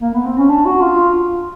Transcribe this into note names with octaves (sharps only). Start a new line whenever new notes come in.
A#3
B3
C4
C#4
D4
F#4
F4